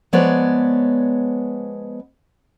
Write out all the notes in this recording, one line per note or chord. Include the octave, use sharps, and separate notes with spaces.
F3 G#3 B3 C#5 D5